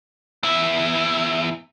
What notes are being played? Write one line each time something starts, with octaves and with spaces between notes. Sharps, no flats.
E2 E4